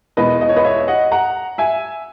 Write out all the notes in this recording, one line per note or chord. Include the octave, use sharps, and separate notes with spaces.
E2 B2 G#3 B4 D#5
D#5
C#5
B4 D#5
C#5 E5
D#5 F#5
F#5 A#5
E5 G#5